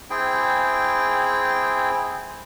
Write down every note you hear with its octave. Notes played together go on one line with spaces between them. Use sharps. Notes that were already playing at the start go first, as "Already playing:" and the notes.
C4 E4 G#4 G5